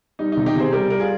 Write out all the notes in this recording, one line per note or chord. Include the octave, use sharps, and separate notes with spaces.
G3 D#4
C3 D#4
D#4 G4
C3 G#4 C5
G3 G4 A#4
G3 A#4
F4 G#4